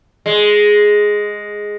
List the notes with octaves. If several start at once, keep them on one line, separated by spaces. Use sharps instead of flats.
G#3